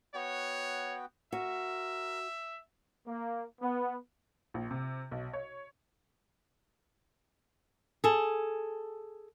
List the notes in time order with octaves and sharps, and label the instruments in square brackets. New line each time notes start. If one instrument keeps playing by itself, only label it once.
[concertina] B3 F#4 G5 [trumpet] C#5
[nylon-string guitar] F#4 [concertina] A#4 [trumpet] E5
[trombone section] A#3
B3
[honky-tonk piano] A#1
C3
B1
C#5
[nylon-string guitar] G#4 A4